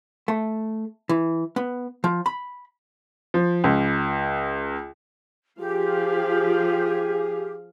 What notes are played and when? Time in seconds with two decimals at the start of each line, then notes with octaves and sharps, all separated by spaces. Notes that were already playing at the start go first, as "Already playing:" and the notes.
0.28 A3
1.09 E3
1.56 B3
2.04 F3
2.26 B5
3.34 F3
3.64 C#2
5.59 F3 G4 G#4 F5